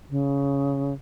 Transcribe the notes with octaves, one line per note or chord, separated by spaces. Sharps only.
C#3